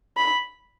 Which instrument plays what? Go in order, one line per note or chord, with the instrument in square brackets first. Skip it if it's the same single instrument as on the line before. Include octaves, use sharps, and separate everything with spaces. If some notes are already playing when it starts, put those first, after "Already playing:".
[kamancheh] B5